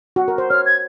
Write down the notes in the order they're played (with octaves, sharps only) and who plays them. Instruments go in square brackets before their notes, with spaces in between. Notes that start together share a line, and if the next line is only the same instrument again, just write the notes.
[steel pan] F#4
A#4
C5
[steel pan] C#5 [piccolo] F6
[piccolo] G#6